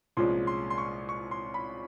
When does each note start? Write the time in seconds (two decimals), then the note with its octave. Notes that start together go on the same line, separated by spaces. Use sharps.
0.17 C2 A#2 F3 G#3 C#4 C6
0.47 C6
0.70 C6
0.78 C#6
1.09 C#6
1.31 C6
1.54 B5